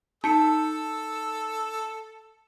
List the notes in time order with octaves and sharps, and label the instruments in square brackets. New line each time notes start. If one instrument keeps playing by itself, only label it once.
[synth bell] D#4 [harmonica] A4 E6 [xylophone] A5 C#7